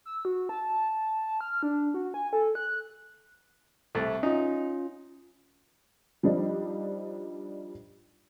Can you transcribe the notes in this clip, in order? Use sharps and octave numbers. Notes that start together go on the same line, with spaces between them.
E6
F#4
A5
F6
D4
F#4
G#5
A4
F#6
C2 A3
C#4 D#4 F4
F3 G3 D4 D#4